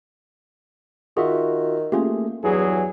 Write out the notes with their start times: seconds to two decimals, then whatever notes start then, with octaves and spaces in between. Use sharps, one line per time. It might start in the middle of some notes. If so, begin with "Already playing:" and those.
1.17 D#3 F4 F#4 G#4 E5
1.92 A3 A#3 C#4 F4 G4 G#4
2.44 E2 G2 F#3 E4 G#4